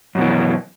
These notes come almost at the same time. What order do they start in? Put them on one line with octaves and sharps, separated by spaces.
F#2 B2 E3